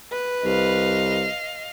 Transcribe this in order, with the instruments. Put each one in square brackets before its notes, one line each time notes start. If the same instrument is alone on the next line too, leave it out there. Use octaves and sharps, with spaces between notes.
[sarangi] B4
[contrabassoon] C2 [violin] D#5 F5